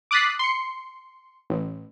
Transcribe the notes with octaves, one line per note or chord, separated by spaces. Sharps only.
D6 D#6 F#6 A6 B6 C7
C6 C#7
A1